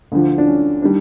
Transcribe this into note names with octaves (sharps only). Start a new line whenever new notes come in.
D2 D3 F3
D4
C#4
D#3 G3 D4